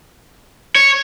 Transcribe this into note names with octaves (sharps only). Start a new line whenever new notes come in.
C#5